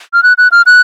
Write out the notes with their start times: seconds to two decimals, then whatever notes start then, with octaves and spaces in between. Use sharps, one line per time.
0.13 F6
0.23 F#6
0.38 F#6
0.52 F6
0.66 F#6